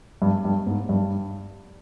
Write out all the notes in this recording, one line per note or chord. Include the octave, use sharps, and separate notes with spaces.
G2
G2
G#2
G2